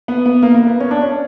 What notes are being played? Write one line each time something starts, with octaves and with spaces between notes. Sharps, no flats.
B3
B3
A#3
A#3
B3
C#4
D4
C#4